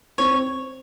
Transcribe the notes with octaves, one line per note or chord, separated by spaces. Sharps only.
C4 C#5